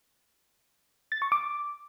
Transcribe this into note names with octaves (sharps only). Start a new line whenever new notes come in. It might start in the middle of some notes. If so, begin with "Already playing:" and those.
A6
C#6
D6